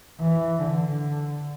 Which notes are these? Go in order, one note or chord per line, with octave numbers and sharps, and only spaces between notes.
E3
D3